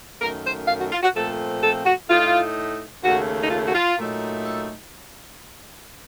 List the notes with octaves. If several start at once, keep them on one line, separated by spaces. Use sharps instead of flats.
F#2 D#3 A3 A#4
C5
F5
F#4
F4
F#4
A#2 F3 A3 C4 A4
A4
F#4
A2 A3 D#4 F4
D#2 C#3 A3 F#4
D#4
F4
F#4
F4
A#2 F#3 A3 D#4
A4